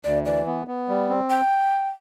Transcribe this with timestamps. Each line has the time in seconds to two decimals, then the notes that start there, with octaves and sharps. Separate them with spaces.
0.04 D2 D5
0.25 E3 D5
0.46 B3
0.67 B3
0.89 G3
1.10 C4
1.30 G5